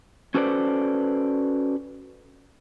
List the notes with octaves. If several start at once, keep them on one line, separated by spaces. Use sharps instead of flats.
C#4 F#4 A4 B4 C5 D5